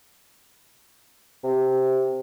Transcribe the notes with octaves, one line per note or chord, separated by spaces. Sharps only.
C3